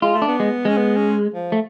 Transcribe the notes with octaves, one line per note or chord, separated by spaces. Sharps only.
G#3 F4
A3
D4
B3
G#3
G#3 C#4
B3
C#4
F3
A3